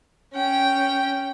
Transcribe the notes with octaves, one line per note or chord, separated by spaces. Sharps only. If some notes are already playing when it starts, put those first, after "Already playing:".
C#4 G5